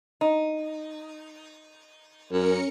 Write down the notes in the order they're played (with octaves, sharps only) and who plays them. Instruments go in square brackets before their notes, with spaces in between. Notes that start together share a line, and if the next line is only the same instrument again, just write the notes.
[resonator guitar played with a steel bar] D#4
[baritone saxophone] F#2 [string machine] C#4 A#4 C#7